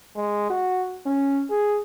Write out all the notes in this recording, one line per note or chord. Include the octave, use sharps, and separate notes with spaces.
G#3
F#4
C#4
G#4